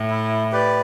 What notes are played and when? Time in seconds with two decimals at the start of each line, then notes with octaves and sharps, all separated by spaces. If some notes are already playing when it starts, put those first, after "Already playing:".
Already playing: A2
0.10 E4
0.52 G4 B4 D5